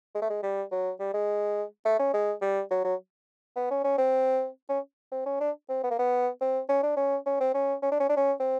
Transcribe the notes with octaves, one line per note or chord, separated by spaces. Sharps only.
G#3
A3
G#3
G3
F#3
G3
G#3
A3
C#4
G#3
G3
F#3
F#3
B3
C#4
C#4
C4
C#4
C4
C#4
D4
C4
B3
A#3
B3
C4
C#4
D4
C#4
C#4
C4
C#4
C#4
D4
C#4
D4
C#4
C4